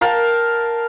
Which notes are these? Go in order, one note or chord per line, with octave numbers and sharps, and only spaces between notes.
A#4 F5 G5 A5